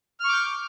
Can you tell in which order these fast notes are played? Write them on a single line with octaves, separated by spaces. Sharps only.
F6 C#6 D6 G6